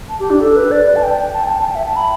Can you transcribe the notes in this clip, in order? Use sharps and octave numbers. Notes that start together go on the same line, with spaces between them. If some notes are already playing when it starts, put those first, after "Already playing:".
A5
G4
D4
A4
B4
D5
A5
G5
A5
G5
A5
A5
G5
E5
A5
B5